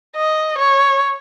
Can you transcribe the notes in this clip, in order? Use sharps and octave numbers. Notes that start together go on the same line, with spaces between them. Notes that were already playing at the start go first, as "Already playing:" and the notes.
D#5
C#5